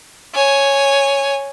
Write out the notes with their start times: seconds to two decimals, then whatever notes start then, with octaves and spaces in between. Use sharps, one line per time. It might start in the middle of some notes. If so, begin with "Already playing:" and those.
0.35 C#5 G#5